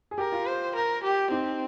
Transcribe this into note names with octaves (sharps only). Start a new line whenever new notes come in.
G#4
G4 A#4
F4
C5
A#4
G4
C4 D#4